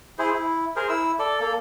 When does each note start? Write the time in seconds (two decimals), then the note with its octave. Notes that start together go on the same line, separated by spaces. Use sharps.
0.18 E4 G#4 C5
0.32 E4
0.76 G#4 A#4 C5
0.89 E4 E6
1.19 A4 D5
1.40 A#3 A4